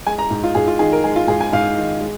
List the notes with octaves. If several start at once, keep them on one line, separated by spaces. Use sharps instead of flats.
G#3 G#5
A#5
G#2
F4
G#2 G#4
F4
D#3 G#4
A#4
G#3 G#4
F4
G#2 G#4
G#5
G#2 F5
D#3
G#3